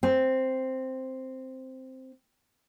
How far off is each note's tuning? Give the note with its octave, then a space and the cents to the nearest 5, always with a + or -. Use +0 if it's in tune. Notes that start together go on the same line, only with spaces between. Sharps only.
C4 +0